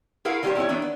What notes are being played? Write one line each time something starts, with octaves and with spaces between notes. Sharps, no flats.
E4 G#4 A#4 B4 F5 F#5
D#3 F#3 G3 D#4 G4 C5
B2 E4 F#4 B4 C#5
D#3 E3 B3 D4
B3